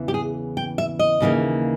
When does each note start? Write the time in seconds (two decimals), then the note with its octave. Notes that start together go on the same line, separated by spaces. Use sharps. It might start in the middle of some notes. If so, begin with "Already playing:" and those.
Already playing: E2 C#3 E3
0.08 G4
0.14 G#4
0.57 G5
0.78 E5
0.99 D#5
1.20 D#2 C#3 E3 G3 A#3